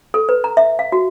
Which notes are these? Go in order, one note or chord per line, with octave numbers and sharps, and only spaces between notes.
A4
B4
A#5
E5
F5
F#4